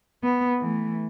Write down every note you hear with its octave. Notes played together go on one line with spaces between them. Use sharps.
B3
E3 A3